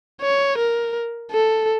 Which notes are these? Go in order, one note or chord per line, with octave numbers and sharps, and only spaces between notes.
C#5
A#4
A4